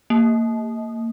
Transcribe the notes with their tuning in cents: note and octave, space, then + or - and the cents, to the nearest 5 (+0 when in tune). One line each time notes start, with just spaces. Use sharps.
A#3 -25